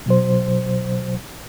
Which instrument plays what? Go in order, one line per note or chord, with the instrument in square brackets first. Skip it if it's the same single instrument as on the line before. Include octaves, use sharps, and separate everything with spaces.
[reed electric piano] B2 F#3 C5